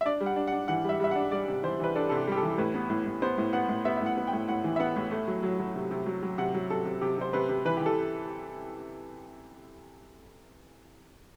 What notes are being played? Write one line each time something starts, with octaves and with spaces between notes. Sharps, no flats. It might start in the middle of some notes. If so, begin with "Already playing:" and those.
E5
D4 D5
G3
F#5
D4
F#5
D4
E3 F#5
G3 E5
G3 E5
F#5
D4
G3 D5
C3
E3 C5
E3 B4
D4 A4
C3 A4
G4
G3 G4
A4
E3
A2 B4
B3
A2
A2
B3 C5
A2
B3 F#5
A2
B3 E5
E5
A2
F#5
B3
G5
A2
A2 F#5
E3
E5
B3 F#5
A2
A3
F#3
F#3
F#3
C3
C3
F#3
F#3
C3 F#5
F#3
C3 A4
C3
C3 G4
C3 C5
C3 B4
C3
E3 B4
E3 G4
A4